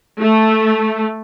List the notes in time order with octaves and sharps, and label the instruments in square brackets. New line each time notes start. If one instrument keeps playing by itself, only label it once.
[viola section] A3